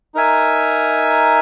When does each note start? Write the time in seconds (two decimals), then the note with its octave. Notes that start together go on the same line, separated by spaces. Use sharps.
0.14 D#4 A#4 E5 G#5